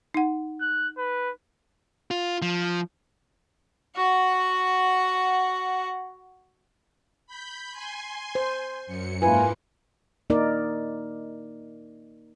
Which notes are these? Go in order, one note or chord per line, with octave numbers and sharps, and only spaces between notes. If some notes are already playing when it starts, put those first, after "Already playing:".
D#4 F#5
F#6
B4
F4
F3
F#4 F#5
B5 G6
G#5 C6
C5
F#2 C#7
G#2 A#3 E4 F4 B4 G#5
A#3 D#4 A#4 D5